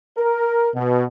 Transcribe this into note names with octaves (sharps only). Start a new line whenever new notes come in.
A#4
B2